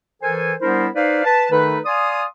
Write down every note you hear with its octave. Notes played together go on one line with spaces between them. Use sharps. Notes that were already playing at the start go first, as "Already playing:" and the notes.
E3 A4 A#4 C5 G#5
G3 B3 D4 E4 A#4 C5
D#4 B4 C5 D5 F5
B4 A5
D#3 A3 D#4 A4 B4
D5 F5 G#5 C6 D#6